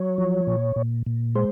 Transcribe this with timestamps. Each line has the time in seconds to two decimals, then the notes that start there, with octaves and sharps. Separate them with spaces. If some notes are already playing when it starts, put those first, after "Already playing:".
Already playing: F#3 C#5
0.18 F3
0.47 A#2
0.76 A#2
1.06 A#2
1.35 G#3 C5